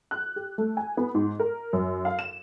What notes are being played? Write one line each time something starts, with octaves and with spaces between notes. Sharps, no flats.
F#6
G4
A3
G#5
B3
G#2
A#4
F#2
F5
E7